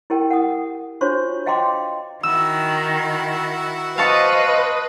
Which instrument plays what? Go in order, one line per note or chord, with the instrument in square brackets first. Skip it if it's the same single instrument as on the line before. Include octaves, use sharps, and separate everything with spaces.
[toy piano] E4 G4 A#4 G5
F#5 D#6
D4 F4 F#4 C5 C#5 C#6
D#5 F5 G5 A#5 C6 D6
[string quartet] D#3 [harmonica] E4 F#4 [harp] E6
[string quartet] B4 [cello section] C5 D#5 [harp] F5 A5 C#6